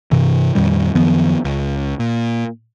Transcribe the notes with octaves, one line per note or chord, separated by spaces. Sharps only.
G2 C3 E3
F2 A#2 D#3 G3
F#2 D#3 F3 B3
C#2
A#2